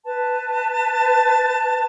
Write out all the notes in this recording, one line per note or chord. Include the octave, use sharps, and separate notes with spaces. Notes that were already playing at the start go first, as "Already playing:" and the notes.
B4 A5